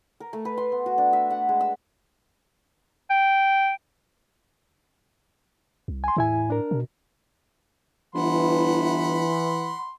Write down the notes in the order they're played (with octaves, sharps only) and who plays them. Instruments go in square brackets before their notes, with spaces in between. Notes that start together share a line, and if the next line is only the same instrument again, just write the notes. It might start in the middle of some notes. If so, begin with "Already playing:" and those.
[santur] A#4
A3
B4
C6
B3
F#4
D4
E5
F#5
G#3
E6
[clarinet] G5
[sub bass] C2
[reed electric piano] G#5 C6
[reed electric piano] E2 E4 G#5 [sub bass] A2
[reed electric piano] D4 A#4
[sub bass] B2
[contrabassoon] G1 [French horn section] E3 [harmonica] F#5 B5 C6